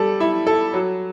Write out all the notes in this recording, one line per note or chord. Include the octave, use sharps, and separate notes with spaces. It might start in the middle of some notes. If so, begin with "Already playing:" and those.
Already playing: G3 A4
E4
A4
F#3